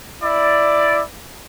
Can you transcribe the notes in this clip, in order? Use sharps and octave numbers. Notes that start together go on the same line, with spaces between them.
E4 D5